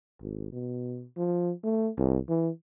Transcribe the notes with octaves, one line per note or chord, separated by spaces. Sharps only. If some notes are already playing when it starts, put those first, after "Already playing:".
G#1
B2
F3
A3
C2
E3